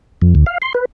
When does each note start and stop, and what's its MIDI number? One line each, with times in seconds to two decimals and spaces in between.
0.22 0.34 41
0.35 0.45 38
0.46 0.58 77
0.62 0.73 84
0.74 0.85 71